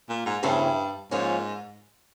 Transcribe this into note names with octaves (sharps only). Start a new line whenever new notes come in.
A#2
G#2
E2 G2 C#3 E3 A3 C4
G#2 F3 A#3 C#4 F4